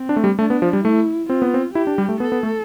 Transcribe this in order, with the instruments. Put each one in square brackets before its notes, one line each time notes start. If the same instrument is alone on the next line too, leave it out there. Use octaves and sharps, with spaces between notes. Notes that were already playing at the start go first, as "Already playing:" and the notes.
Already playing: [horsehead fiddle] C4
[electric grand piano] D4
A3
G3
[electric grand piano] A3 [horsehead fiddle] D4
[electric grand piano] B3
F3
G3
[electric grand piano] A3 [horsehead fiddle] E4
[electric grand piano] C4 [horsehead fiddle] F4
[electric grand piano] B3
C4
[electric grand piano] E4 [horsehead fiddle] G4
[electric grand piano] D4
G3
A3
[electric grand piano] B3 [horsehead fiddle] A4
[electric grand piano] B3
A3